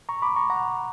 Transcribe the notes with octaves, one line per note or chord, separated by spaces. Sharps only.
A#5 C#6
B5 D6
A#5 C#6
F#5 A#5